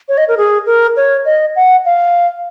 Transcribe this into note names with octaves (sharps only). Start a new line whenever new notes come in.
C#5
D#5
A#4
G#4
A#4
C#5
D#5
F#5
F5